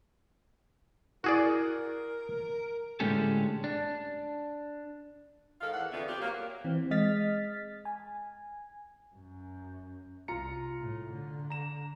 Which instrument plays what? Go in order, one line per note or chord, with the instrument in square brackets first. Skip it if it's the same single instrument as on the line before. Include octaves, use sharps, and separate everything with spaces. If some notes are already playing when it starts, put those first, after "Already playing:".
[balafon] E4 [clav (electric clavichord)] F#4 G#4 D5 [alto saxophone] A#4
[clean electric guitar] A2 D3 G#3 C#4 G4 A4
D4
[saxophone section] G#2 D#3 A4 F5
E2 F#5
F2 D3 A3 B3 E5
C4 G4
F#3 A#3
[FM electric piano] E3 C4
G#3 D#5 F6 A6 B6
G#5
[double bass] F#2
[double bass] C2 [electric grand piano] F4 A#5 C#7
[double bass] A2
D3
[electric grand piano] A#5 E7